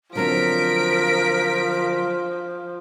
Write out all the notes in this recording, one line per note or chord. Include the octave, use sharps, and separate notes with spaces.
D3 F3 F#3 C4 A#4 B6 D7